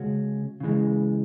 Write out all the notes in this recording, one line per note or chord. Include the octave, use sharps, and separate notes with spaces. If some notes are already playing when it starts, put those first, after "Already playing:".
Already playing: C#3 G#3 C#4 F#4
C#3 E3 G#3